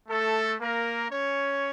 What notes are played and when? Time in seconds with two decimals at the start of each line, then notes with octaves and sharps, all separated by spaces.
0.09 A3 A4
0.60 A#3 A#4
1.10 C#4 C#5